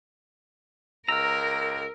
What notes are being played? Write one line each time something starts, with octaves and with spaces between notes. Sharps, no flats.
C#2 A#4 A#5 E6 F6